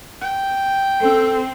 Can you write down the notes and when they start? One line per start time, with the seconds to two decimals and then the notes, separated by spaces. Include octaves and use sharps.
0.21 G5
1.01 C4 A4